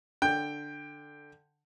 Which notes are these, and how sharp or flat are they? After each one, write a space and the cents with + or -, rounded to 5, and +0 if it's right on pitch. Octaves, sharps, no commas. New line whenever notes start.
D3 +5 G5 +10